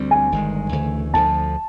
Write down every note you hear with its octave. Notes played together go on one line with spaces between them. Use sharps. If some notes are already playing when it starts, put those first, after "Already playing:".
Already playing: D2 D3 G3 C4
G#5
G1 G2 D#3 G#3
D2 C#3 E3 A3
D2 D3 F3 A5